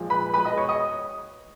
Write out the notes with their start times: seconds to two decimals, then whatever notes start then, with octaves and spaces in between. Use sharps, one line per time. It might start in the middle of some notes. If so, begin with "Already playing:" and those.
Already playing: A#2 F3 G#3
0.10 B4 B5
0.34 B2 G#3 B4 B5
0.45 D#5 D#6
0.58 C#5 C#6
0.69 D#5 D#6